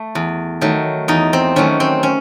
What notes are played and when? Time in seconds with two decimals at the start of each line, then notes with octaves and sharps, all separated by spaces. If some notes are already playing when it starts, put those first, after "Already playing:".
Already playing: A3
0.15 E2
0.61 D#3 F#3 A3
1.08 E2 D#4
1.33 C4
1.56 D#3 F#3 A3 C#4
1.80 C4
2.03 C#4